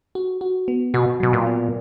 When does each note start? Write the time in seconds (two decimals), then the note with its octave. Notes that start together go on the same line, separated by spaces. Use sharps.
0.15 F#4
0.41 F#4
0.68 B3
0.94 B2 F#4
1.20 B2 F#3
1.33 A#2
1.47 B3